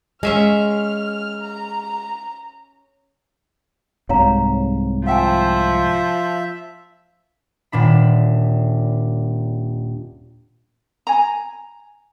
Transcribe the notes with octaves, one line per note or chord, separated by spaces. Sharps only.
G#3 C#4 E5 F5 F6
A#5
C2 G#2 C3 C#5 F5 A#5
F3 E5 F5 G5 G#5
D#1 A#2 D4 B5
G#5 A#5